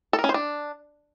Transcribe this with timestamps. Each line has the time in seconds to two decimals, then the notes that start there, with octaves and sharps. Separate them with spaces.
0.13 A4
0.19 A#4
0.24 C#4
0.29 C5
0.34 D4